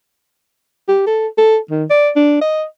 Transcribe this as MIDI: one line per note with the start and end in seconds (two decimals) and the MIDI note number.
0.88 1.06 67
1.07 1.28 69
1.38 1.58 69
1.71 1.84 51
1.90 2.11 74
2.16 2.38 62
2.42 2.65 75